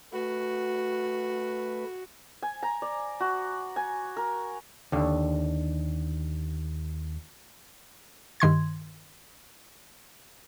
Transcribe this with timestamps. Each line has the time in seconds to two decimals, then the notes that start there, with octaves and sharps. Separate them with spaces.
0.13 A3 F#4 B4
2.42 G#5
2.63 A#5
2.82 D5
3.20 F#4
3.76 G#5
4.17 A#4
4.92 D#2 D3
8.40 G2 D#3 C6 G#6